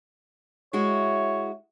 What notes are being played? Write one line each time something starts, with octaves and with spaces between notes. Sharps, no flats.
G#3 E4 F#4 C#5